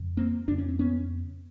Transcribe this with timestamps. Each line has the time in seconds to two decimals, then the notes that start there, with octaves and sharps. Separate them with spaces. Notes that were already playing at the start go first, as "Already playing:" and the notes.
Already playing: F2 C#3
0.17 A#3 C4
0.48 F2 C#3 D4
0.58 C#4
0.68 C4
0.79 B3 C#4